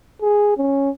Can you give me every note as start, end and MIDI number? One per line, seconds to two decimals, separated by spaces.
0.22 0.54 68
0.57 0.90 61